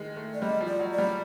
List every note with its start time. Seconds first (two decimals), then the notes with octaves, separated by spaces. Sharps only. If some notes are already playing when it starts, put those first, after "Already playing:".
Already playing: D#3 G#3
0.17 A3
0.33 D5
0.42 G3 D#5
0.60 F3
0.66 D5
0.79 F#3
0.92 D5
0.98 G3